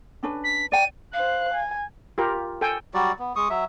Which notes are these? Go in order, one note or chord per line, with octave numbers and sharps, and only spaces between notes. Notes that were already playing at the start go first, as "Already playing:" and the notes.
C#4 D4 B4
B6
D5 G5 D#7
C5 F5 F#6
G#5
F4 G4 A#4
A4 G5 G#5
F#3 G3 F#4 D5
B3
G#3 C#6 D#6
F#3 E5